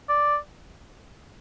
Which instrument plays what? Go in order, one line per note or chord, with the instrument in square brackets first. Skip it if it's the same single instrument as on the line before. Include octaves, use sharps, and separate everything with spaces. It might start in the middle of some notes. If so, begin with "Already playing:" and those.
[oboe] D5